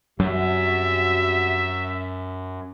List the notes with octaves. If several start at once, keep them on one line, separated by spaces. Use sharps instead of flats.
F#2 C3 F#3 G3 F#4 E5